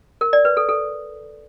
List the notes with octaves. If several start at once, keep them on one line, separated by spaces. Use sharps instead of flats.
A#4
D5
B4
A4
A4